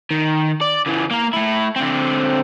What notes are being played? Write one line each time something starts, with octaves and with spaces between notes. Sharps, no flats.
D#3
D5
C#3 E3
A#3 A#4
A3 E4
D3 C4